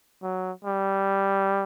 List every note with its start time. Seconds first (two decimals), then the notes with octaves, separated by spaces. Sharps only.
0.23 F#3
0.65 G3